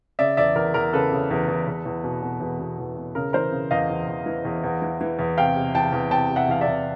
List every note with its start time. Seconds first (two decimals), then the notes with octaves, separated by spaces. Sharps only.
0.19 C#3 D5 E5
0.37 E2 D5 E5
0.55 E2 A#4
0.74 E2 A#4
0.93 C#3 A4 B4
1.12 C#3
1.31 E2
1.48 E2
1.67 E2
1.85 E2
2.04 B2
2.23 B2
2.41 E2
2.59 B2
2.79 E2
2.97 B2
3.15 C#3 A#4
3.33 E3 A#4 C5
3.52 C#3
3.71 E2 D#5 F5
3.89 E2
4.08 E2
4.26 E3
4.45 E2
4.64 E2
4.82 E3
5.01 E3
5.19 E2
5.37 C3 F5 G5
5.56 C3
5.74 E2 G5 A5
5.92 E2
6.11 C3 G5 A5
6.30 C3
6.36 E5 F#5
6.48 E2 F5
6.61 D5 E5
6.68 E2